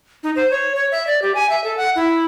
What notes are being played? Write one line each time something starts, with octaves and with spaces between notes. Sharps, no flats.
D#4
C5
C#5
C#5
E5
D5
G4
G#5
E5
A4
F#5
E4